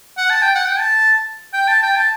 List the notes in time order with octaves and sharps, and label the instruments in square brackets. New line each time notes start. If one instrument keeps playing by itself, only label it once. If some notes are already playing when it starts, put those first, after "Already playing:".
[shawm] F#5
A5
G5
F#5
G5
A5
G5
A5
G5
A5